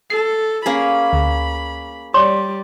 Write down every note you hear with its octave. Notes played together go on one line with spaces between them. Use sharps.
A4 C7
A#3 C#4 G#4 B5
D2
G3 C#5 D5 C6